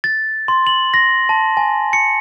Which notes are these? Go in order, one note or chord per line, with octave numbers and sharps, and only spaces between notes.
A6
C6
F#7
A#6
A5
G#5
C#7